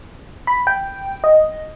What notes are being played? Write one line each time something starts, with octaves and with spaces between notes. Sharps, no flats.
B5
G5
D#5